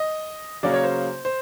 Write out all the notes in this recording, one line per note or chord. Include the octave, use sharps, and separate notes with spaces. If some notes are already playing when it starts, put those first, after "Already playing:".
Already playing: D#5
C#3 F#3 A#3 C#4 D5
C#5
C5
C5